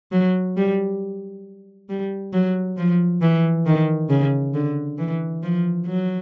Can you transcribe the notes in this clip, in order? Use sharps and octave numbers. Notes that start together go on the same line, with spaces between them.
F#3
G3
G3
F#3
F3
E3
D#3
C#3
D3
E3
F3
F#3